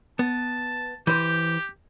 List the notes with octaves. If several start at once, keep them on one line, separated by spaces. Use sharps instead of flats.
B3 A5
E3 G4 C5 G6